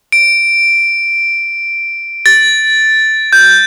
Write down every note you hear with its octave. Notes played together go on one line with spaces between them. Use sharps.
D7
A6
G6